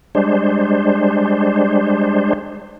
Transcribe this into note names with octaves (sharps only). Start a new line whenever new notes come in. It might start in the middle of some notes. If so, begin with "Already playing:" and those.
G3 G#3 D4 C5